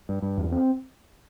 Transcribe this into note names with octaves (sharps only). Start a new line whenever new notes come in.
G2
G2
E2
C4